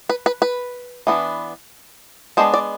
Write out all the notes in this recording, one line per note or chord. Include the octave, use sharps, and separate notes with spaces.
B4
B4
B4
E3 B3 D4
G#3 B3 D4 C5
D5